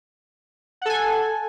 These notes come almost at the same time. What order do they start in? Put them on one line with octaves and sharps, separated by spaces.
F#5 A4 G#5